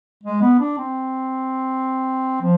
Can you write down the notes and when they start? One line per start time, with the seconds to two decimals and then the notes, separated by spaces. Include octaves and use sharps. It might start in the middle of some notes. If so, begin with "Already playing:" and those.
0.23 G#3
0.41 B3
0.60 D4
0.78 C4
2.42 F3